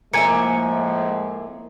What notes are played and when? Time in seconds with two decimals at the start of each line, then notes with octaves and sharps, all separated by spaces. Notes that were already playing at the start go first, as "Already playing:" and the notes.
0.13 A2 F3 G#3 A#3 E5 G#5 G#6 C#7